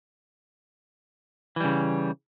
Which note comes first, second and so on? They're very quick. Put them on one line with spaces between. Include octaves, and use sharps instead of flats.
E3 G3 C#3